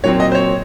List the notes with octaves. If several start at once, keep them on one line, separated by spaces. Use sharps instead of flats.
A#2 F#3 C4 C#5
D#5
C5
C#5